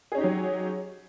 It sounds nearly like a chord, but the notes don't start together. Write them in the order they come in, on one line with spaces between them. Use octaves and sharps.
G#4 C#4 D#4 G4 F#3